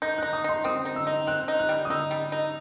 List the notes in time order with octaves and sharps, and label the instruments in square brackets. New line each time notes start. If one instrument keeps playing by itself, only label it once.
[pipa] D#4 [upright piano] G6
[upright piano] F#6
[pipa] D#4
[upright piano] D#6
[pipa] D#4 [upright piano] C6
[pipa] C4 [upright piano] D#6
[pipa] D#4
[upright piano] E6
[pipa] D#4
[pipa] C4 [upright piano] F#6
[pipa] D#4
[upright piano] F#6
[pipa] G3
[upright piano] D#6
[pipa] D#4 [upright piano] E6
[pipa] G3
D#4